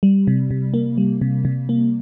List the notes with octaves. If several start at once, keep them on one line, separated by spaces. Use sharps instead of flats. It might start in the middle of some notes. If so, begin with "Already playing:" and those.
G3
C3
C3
A#3
G3
C3
C3
A#3